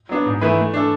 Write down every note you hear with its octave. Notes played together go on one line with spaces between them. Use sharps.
F#3 B3 D4
G#2
E3 A3 E4 B4
A3
D4 A4